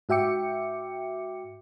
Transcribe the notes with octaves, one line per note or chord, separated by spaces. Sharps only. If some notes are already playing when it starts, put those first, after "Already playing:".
G#2 F#4 E5 G5 D6 C#7